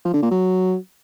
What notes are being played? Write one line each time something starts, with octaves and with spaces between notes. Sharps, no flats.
F3
D3
A#2
F#3